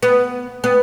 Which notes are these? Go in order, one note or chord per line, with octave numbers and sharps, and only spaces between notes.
B3
B3